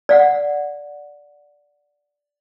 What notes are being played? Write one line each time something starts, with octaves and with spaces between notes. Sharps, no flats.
D5 F5 F#5